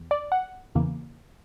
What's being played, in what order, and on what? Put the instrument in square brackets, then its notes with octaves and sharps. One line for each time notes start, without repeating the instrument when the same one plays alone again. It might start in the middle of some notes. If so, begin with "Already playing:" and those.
Already playing: [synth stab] E2
D5
F#5
E2 C#3 E3 A#3